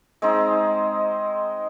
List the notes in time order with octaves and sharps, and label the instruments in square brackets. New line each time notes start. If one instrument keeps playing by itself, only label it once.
[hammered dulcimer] G#3 C4 D#4